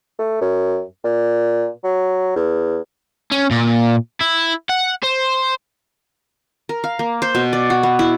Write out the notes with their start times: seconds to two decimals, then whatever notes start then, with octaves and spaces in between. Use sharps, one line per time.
0.19 A3
0.41 F#2
1.04 A#2
1.84 F#3
2.36 E2
3.31 C#4
3.51 A#2
4.20 E4
4.69 F#5
5.03 C5
6.69 A#4
6.84 F5
6.99 A#3
7.22 C5
7.35 B2
7.53 D5
7.70 F#4
7.83 B3
7.99 E4